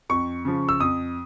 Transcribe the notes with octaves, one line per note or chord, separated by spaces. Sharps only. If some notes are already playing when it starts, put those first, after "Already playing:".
F2 C#6
C#3 F3
E6
F2 D#6